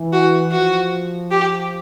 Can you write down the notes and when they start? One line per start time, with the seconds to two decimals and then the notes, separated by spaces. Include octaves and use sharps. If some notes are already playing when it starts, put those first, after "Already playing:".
Already playing: E3
0.13 F#4
0.52 F3 F#4
1.31 G4